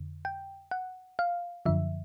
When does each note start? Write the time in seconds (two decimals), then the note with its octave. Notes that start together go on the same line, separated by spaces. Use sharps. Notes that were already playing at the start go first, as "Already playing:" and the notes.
Already playing: F2 D3
0.25 G5
0.71 F#5
1.19 F5
1.66 F#2 D3 F3 E5